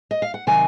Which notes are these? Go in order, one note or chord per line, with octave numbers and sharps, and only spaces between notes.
D#5
F5
F#5
C3 D#3 F#3 G#5